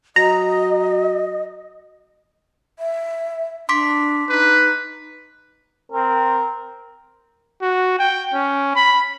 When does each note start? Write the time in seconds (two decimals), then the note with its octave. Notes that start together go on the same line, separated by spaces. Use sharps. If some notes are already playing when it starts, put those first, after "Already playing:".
0.16 F#3 D#5 A#5
2.79 E5
3.69 D4 C6 D6 B6
4.29 D#4 B4
5.92 C4 A#4
7.62 F#4
7.99 G5
8.34 C#4
8.76 B5